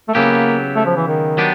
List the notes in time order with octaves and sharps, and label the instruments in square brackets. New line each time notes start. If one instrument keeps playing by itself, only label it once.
[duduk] A3
[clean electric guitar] C#3 F#3 B3 E4 G4 [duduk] A#3
[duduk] A3
F3
E3
D#3
[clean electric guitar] F#3 B3 D4 G4